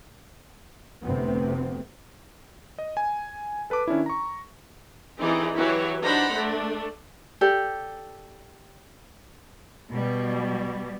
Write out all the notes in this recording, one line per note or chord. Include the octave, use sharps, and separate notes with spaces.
F1 D2 C3 B3 C4
D#5
G#5
A4 B4 A5 D6
D#3 C#4 D4 E4
A#5 C#6
E3 C4 D#4 G4 G#4 D5
E3 F#3 E4 F#4 G4 C#5
D4 D#4 C5 F#5 A#5 B5
A3 D4
G4 A4 D5
B2 G3